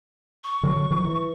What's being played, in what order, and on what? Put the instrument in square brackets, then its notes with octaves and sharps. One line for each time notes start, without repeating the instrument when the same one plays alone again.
[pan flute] C#6
[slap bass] D3 F#3
D#3 F3
E3